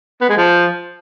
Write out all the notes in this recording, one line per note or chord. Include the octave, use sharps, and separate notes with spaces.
B3
G#3
F3